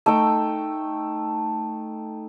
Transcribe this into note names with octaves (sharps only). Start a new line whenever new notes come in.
A3 D#4 G5 E6